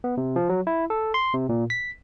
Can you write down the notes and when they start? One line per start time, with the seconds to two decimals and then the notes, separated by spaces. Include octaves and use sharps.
0.04 B3
0.17 C3
0.36 F3
0.49 F#3
0.67 E4
0.90 A4
1.14 C6
1.34 C3
1.49 A#2
1.70 B6